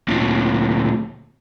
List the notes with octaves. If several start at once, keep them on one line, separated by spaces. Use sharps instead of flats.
D2 A#2